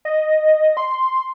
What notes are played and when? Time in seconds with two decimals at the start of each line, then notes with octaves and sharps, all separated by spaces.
0.05 D#5
0.77 C6